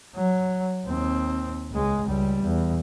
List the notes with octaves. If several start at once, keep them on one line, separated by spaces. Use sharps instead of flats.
F#3
D#2 C4
C#2 G#3
C#2 G3
E2